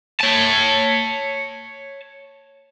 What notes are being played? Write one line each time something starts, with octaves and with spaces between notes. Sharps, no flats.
C#5 A5